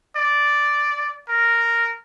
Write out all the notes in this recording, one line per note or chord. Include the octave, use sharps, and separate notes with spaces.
D5
A#4